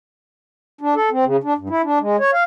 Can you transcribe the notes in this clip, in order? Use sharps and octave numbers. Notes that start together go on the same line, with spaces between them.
D4
A4
C4
C#3
D4
G2
E4
D4
G#3
C#5
F5